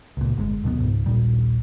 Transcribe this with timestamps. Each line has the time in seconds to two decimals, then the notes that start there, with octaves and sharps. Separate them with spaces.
0.17 C#2 A#2
0.37 G1 A#2 G#3
0.64 D#2 B2 F#3 B3
0.80 C#2 G#2
1.06 A#1 D#2 A#2 G3